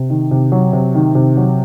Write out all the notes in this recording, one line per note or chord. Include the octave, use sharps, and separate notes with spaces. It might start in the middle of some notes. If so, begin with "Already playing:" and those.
Already playing: C3
D#3
C3
F#3
C3
D#3
C3
F#3